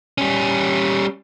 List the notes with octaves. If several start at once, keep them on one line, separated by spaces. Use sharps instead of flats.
G3 C#4